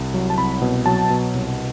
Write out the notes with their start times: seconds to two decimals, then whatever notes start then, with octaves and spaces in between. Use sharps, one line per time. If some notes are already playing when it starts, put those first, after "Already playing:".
Already playing: C2
0.14 F#3
0.30 A5
0.38 C2 B5
0.62 B2
0.86 F#3 A5
1.10 B2
1.34 C2